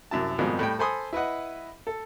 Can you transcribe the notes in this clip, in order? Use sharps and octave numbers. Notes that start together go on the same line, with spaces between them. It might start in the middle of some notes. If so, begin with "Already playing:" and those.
C2 F#2 E4 A5
F2 G#2 B2 D#3 F3 G3
A2 G3 G5
A4 C5 G#5 B5 C6 D#6
E4 B4 D#5 F#5
A4